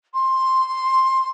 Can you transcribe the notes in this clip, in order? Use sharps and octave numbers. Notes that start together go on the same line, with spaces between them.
C6